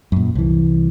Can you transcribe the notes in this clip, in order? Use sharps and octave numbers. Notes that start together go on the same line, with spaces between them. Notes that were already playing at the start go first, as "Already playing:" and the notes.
F#2 A#2
C2 E3